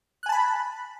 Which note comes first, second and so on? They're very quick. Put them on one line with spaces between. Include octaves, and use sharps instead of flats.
F#6 G#5 A5 B5